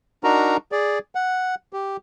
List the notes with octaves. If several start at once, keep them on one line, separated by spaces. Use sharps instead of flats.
D4 D#4 F#4 A#4 A#5
G#4 D5
F#5
G4